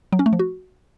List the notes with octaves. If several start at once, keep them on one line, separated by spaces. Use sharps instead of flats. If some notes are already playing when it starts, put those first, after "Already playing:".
F#3
C#4
A3
F3
F#4